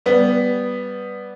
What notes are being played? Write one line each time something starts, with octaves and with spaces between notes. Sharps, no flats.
G3 B3